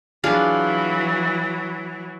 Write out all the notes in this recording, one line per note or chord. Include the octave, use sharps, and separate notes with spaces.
E3 F#3 D4 F4 G#4